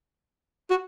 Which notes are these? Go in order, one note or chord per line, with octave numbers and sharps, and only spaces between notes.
F#4